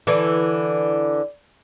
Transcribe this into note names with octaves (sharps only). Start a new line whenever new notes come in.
D3 E3